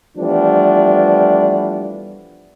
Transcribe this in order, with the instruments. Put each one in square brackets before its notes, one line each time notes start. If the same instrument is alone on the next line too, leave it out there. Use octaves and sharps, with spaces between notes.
[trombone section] E3 F3 G3 A3 B3 D4